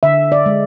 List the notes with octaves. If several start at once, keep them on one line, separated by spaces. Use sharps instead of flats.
D3 E5
D5
G#3